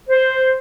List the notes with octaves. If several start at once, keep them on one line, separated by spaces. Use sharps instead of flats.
C5